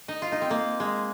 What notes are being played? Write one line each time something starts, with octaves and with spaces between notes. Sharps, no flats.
D#4
F4
D#4
C4
A#3
G#3